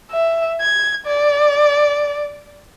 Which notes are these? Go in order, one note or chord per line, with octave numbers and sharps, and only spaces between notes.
E5
G#6
D5